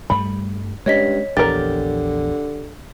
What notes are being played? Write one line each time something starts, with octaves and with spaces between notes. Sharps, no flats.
G2 G3 A3 B5
G2 G#3 C#4 C#5 D#5 B6
A#1 E2 D3 G4 A#4 A6